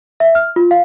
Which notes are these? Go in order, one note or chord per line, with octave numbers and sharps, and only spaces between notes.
E5
F6
F4
F5